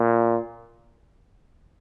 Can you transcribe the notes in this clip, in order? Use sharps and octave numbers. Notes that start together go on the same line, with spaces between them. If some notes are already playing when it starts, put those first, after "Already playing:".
Already playing: A#2